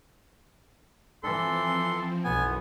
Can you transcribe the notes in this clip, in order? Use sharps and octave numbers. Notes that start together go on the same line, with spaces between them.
E3 F3 C4 A4 C6
B1 F#2 E3 B3 G#5